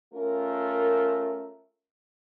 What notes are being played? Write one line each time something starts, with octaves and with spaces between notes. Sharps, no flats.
A3 C#4 F4 A#4